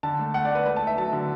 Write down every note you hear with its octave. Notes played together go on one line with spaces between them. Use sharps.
D3 A5
A3
A3 F#5
D5
A3
B4
A3 B4
A5
A3 E5
F#3 A5
D3